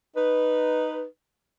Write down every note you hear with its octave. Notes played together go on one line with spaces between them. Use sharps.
D#4 B4